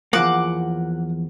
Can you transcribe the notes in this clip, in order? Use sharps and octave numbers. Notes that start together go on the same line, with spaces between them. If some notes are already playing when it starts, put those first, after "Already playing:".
E2 F3 A#3 F#5 D6